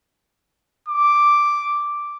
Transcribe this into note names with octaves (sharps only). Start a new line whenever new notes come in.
D6